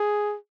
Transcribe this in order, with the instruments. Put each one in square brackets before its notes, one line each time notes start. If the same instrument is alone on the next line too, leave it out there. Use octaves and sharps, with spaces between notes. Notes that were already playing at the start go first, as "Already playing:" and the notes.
Already playing: [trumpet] G#4